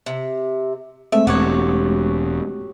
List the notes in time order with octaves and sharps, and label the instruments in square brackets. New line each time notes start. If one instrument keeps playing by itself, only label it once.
[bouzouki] C3
[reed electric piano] G#3 A3 C4 [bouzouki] E5
[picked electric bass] E1 [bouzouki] F#4 G4 C#5